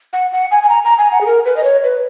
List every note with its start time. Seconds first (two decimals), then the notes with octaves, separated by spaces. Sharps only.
0.13 F#5
0.32 F#5
0.51 G#5
0.63 G#5
0.69 A#5
0.84 A#5
0.98 G#5
1.12 F#5
1.21 G#4
1.26 A#4
1.45 B4
1.56 D#5
1.64 C#5
1.84 B4